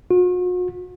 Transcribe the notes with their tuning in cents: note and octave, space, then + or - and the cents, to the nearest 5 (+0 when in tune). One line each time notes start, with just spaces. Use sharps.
F#4 -45